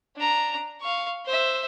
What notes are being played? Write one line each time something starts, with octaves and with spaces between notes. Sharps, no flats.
D4 A#5
F5 C#6
C5 E5